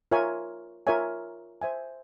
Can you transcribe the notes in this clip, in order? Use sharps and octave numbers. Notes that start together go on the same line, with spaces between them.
F4 A#4 C#5 E5 G#5
F4 A#4 C#5 E5 G#5
C5 E5 G#5